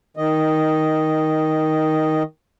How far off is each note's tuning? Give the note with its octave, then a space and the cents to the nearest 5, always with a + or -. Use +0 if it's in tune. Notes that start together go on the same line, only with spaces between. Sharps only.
D#3 +10 D#5 +0